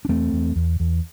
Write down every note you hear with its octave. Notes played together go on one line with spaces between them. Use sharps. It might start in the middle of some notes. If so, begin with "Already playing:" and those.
D4
E2 A3 C4
E2
E2
E2